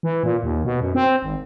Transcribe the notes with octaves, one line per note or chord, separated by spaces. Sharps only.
E3
A#2
D#2
B2
F#2
C4
G#1